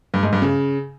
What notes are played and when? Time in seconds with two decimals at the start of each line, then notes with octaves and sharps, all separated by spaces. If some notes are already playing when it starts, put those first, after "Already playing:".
0.14 G2
0.23 G#2
0.33 G2
0.42 C#3